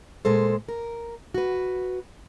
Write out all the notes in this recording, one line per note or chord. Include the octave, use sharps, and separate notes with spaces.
A#2 G#3 A4 C5
A#4
F#4 B4